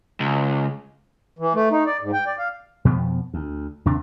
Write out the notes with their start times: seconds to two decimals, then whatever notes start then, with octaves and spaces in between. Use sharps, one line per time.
0.20 C#2
1.39 E3
1.54 A3
1.71 D#4
1.86 D5
2.01 G#2
2.13 G5
2.26 D5
2.39 F5
2.85 F2 B2 F3 B3
3.34 D2
3.85 D#2 C3 D4